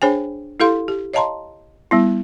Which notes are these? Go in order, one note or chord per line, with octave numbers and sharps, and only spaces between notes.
D4 G#4 C5 C#5 G5 G#5
E4 G4 A4 F5 C6
G4
C#5 D#5 F5 A5 A#5 C6
G3 B3 E4